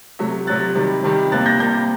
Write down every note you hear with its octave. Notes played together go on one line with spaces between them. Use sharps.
C3 F#3 A3
C3 F#3 A3 F#6 A6
C3 D#3 G3
C3 D#3 G3
C3 G3 A#3 F#6 A6
G6 A#6
C3 G3 A#3 G6 A#6